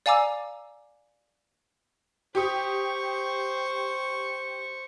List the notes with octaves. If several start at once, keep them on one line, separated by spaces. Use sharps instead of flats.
D5 F5 G#5 A#5 D6 E6
G4 C5 C#6 D#6